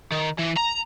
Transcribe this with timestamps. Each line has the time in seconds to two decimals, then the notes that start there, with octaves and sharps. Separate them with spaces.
0.12 D#3
0.39 E3
0.57 A#5